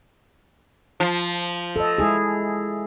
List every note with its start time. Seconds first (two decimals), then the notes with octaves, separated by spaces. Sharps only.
1.00 F3
1.76 A4 D#5
1.98 G#3 E4 G#4